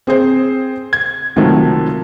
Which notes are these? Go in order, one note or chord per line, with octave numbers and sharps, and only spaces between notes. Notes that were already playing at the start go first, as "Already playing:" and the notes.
C4 G#4 C5
G#6
C2 D#3 F3 F#3 A3